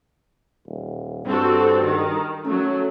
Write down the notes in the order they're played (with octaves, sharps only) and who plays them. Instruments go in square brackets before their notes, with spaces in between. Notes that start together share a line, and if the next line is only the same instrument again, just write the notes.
[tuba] D#1
[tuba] G2 [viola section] C4 F#4 A4
[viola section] D#3
[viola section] F#3 A3 [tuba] C#4